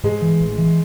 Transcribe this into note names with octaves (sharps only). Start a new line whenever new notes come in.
G#2 G#3
E3
A1
E3